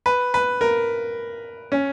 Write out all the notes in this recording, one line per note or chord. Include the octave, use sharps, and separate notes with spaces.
B4
B4
A#4
C#4